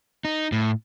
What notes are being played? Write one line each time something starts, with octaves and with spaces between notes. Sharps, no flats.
D#4
A2